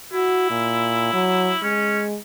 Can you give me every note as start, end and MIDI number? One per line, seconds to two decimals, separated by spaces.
0.13 1.58 64
0.13 0.49 66
0.50 1.13 46
1.13 1.53 54
1.63 2.17 56
1.63 2.01 61